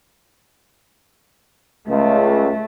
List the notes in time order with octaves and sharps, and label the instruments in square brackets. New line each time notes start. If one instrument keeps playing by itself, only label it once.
[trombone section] C#2 [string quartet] A3